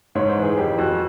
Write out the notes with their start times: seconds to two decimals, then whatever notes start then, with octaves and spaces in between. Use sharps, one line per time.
0.15 G#2 C#5
0.29 C5
0.37 E3
0.43 G#4
0.57 F2 G4
0.78 F2 F#4